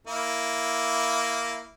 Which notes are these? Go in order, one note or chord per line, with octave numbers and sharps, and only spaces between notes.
A#3 E4